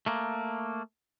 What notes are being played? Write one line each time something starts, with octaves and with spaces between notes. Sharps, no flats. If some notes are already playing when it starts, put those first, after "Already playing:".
A3 A#3